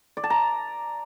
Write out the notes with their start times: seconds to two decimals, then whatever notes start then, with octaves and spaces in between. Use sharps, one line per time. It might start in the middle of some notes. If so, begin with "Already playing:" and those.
0.17 D5
0.24 A5
0.30 A#5